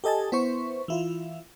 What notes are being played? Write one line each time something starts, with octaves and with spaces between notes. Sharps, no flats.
G4 A4 D#5 G#5 A5
B3 E4 C5 C#6
E3 E4 F4